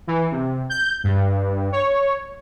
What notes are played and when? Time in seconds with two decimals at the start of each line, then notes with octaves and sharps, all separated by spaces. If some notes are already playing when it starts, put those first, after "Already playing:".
0.07 E3
0.32 C3
0.70 G6
1.04 G2
1.72 C#5